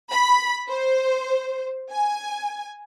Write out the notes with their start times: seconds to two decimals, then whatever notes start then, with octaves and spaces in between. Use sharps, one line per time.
0.11 B5
0.69 C5
1.92 G#5